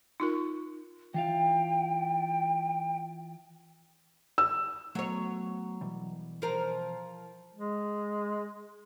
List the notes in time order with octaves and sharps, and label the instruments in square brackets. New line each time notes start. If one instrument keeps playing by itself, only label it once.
[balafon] D#4 F4 A#4
[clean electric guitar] E3 F4 F5 [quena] G5
[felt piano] E6
[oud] F#3 C#5 [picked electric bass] A3 B3
[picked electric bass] B2 E3 G3
[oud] F3 A#4
[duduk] G#3